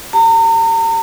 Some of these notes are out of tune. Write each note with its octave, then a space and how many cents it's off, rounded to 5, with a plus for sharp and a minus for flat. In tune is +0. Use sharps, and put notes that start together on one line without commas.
G4 +0 A#5 -40